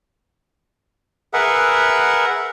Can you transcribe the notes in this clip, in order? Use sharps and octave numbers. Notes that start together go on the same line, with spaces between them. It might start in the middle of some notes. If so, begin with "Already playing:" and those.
G#4 A#4 B4 E5 F#5